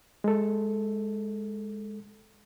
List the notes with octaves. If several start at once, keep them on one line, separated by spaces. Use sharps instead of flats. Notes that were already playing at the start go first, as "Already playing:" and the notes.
G#3 A4